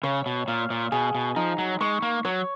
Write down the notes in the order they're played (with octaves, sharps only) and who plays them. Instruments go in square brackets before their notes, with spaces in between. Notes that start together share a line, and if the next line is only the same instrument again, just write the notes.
[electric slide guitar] C#3 [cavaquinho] C#5
[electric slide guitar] B2
[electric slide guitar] A#2 [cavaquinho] F5
[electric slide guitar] A#2
[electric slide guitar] B2 [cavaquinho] G#4
[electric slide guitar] B2
[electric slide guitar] F3 [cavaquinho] D#4
[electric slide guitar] F#3
[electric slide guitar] G#3 [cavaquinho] C#6
[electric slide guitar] A#3
[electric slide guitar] F#3 [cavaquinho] C#5